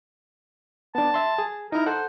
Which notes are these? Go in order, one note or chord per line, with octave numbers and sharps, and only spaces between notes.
B3 D4 A5
E5 C6
G#4
D#4 E4 A#4
A4 C5 F#5